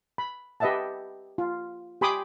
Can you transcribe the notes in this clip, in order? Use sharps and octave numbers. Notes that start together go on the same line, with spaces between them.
B5
G4 B4 D#5 E5 F#5 A5
F4
G4 G#5 B5 C6 D6 D#6